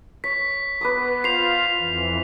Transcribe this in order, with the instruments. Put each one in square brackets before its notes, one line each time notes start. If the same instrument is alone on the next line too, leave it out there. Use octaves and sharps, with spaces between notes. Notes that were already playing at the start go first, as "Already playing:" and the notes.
[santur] C#5 [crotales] B6
[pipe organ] B3 [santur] B4 D6 D#6
[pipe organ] F4 [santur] C5 [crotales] C7 F7
[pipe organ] F2 E3